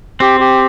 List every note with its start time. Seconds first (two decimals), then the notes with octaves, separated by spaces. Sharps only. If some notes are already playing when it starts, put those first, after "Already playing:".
0.20 C4 G4
0.40 G4